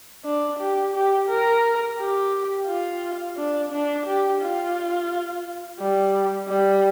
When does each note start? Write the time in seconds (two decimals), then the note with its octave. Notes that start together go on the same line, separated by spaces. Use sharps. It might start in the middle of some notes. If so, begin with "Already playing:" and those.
0.24 D4
0.59 G4
0.94 G4
1.29 A#4
1.98 G4
2.67 F4
3.37 D4
3.72 D4
4.06 G4
4.41 F4
5.79 G3
6.48 G3